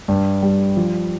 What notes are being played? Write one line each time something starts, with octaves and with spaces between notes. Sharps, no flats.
G2
G3
F3